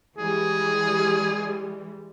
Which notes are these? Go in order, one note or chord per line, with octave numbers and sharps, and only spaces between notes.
E3 G3 G#3 G#4